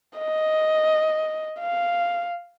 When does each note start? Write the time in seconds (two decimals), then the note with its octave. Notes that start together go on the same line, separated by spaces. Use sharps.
0.18 D#5
1.60 F5